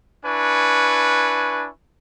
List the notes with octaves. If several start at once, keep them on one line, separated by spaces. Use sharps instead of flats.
D4 E4 B4 G#5 C#6